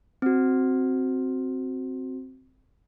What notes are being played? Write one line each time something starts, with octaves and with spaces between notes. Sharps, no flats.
C4 F#4